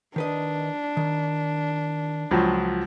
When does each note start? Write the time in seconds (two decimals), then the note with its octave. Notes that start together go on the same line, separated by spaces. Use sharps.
0.16 D#3 D4 B4 D#5
0.97 D#3
2.31 C#2 F3 F#3